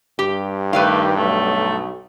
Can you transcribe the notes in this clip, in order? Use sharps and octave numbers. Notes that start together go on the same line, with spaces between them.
G2 G4
D#3 A3 D#4 G4 B4 D5 F5
B1 A3